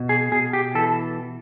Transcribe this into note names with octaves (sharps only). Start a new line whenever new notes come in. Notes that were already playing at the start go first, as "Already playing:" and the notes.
Already playing: B2
G#4
B2 G#4
G4
E3 A4